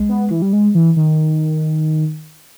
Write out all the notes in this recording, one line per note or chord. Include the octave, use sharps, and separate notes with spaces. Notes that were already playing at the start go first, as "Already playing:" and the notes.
Already playing: G#3
B3
E3
G3
G#3
E3
D#3